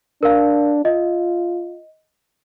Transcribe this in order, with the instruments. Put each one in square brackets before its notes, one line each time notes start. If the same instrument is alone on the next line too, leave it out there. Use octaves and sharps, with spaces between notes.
[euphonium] D4 [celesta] A#4 F5
[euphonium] F4 [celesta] D#5